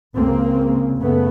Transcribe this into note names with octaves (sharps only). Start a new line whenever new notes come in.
C#2 C#3 A#3 C4
F#2 C#3 A3 B3